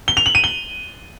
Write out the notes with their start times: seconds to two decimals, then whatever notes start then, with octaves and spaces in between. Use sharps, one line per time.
0.08 G7
0.17 F7
0.26 F#7
0.35 D#7
0.44 G7